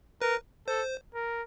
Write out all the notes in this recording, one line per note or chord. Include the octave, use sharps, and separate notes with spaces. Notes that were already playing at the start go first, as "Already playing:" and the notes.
A#4 B4
A4 C5
A#4